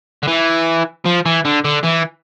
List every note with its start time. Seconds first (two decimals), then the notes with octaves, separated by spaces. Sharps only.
0.23 D3
0.28 E3
1.06 F3
1.26 E3
1.45 D3
1.65 D3
1.84 E3